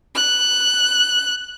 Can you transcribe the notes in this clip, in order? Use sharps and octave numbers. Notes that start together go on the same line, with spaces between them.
F#6